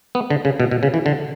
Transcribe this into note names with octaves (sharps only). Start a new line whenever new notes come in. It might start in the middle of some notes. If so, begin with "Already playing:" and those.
B3
D3
C#3
B2
B2
C#3
E3
D3